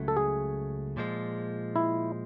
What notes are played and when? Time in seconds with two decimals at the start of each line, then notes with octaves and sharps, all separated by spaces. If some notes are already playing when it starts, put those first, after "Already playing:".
Already playing: C#2 C#3 F#3 A3
0.08 A4
0.17 G#4
0.97 A#2 F3 G#3
1.76 E4